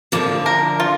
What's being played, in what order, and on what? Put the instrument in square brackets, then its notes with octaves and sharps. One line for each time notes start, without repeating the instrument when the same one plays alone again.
[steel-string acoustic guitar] D3 F3 [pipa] A#3
[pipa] A#4
F4